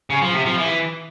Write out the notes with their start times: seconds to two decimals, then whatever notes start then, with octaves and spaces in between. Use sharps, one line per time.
0.10 C#3
0.22 F3
0.34 C3
0.46 F3
0.58 E3